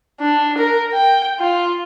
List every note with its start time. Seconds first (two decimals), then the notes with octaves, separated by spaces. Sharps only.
0.21 D4
0.58 A#4
0.93 G5
1.40 F4